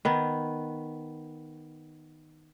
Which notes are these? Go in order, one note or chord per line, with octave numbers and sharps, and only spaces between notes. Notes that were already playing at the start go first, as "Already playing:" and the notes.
D#3 B3